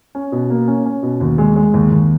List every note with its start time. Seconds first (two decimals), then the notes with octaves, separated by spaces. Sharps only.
0.15 C#4
0.32 B2
0.50 A#3
0.68 C#4
0.85 C#4
1.03 B2
1.20 D#2
1.38 G#3
1.56 G#3
1.74 D#2
1.91 D#2